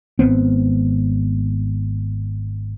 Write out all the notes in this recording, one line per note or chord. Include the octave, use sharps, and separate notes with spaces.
G#1 B3 C4